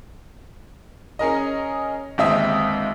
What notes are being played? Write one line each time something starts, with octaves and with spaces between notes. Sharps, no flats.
C#4 G#4 A#4 D#5
G1 D#2 G#3 C4 E5 D#6